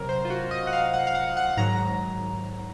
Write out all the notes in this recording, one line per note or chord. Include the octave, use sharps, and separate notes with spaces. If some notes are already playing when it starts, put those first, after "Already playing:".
Already playing: C3 F#3 A#4
C5
F4
F#4
D#5
F#5
F5
F#5
F5
F#5
F#5
G#2 D#3 F#3 A#5